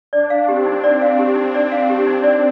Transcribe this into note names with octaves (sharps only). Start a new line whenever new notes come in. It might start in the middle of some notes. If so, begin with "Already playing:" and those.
D4 D5
F5
C4 G4
D#4
D4 D5
F5
G4
D#4
D5
F5
G4
D#4
D5